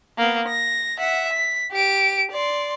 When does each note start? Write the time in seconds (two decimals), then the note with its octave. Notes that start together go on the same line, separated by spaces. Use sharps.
0.18 A#3 B3
0.48 A#6
0.99 E5 F#5
1.33 B6
1.72 G4 D7
2.31 D5 C6